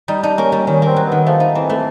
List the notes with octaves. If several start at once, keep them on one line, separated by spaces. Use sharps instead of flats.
G3 D#4
D4 D#4
A#3 C#4
G3 C#4
D#3 C#4
A#3 C4
F#3
D#3 B3
F3 A3
D#4
E3 C4
A3